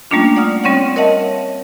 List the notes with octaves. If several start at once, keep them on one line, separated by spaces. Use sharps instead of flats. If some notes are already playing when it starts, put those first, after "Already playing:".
G3 A3 A#3 C#4 D4 F4
D5 F#5 D#6 F6
G3 C4 C#4 C#5 D5 F#5
A#4 C#5 D#5 E5 F#5 A5